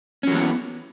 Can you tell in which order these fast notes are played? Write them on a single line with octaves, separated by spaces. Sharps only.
C#4 F#3 E3 B3